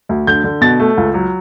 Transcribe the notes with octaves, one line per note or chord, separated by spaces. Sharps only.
D2
D3 G6
D3
B2 A6
A3
C#2
F#3